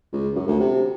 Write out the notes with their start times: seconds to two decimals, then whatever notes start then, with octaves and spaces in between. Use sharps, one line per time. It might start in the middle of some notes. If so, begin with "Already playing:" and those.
0.12 C#2
0.36 F#2
0.47 D2
0.60 C3